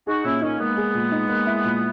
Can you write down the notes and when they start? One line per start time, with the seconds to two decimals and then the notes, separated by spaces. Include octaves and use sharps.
0.07 D#4 F#4 G#4
0.24 A#2 C#4 E4
0.42 A#3 C#4 D#4
0.59 G#3 A#3 B3
0.77 G#4
0.94 A#2
1.12 D#4
1.29 A#3
1.47 E4
1.65 A#2